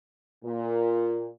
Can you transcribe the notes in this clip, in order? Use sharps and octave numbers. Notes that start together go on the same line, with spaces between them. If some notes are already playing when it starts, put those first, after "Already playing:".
A#2